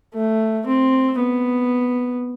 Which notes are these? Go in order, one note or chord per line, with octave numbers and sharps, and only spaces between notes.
A3
C4
B3